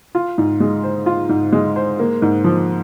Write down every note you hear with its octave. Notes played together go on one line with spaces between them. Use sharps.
F4
G#2
G#3
C5
F4
G#2
G#3
C5
A#3
G#2
F3